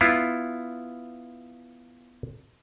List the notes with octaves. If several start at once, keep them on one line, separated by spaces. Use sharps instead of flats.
B3 E4 F4